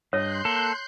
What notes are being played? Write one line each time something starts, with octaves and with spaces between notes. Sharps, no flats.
G2 C#5 D#5 C6 F#6 G6
A#3 A4